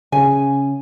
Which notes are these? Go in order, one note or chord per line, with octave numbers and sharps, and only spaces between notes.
C#3 G#5